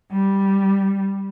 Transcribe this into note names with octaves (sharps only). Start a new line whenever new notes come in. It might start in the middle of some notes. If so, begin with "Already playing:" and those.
G3